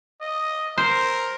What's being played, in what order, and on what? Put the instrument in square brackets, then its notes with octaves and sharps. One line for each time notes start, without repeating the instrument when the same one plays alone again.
[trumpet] D#5
[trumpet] A#4 [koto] C5